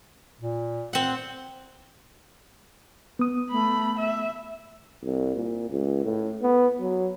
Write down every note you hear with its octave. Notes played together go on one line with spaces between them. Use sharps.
A#2
C4 F#5
B3 D#6
A3 B5
E5
C2
A#2
C#2
A2
B3
F#3